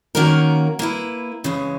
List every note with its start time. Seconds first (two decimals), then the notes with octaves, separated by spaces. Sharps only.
0.15 D#3 A#3 C#4 F#4 A#4
0.79 A#3 E4 B4
1.44 C#3 E3 G#3 C#4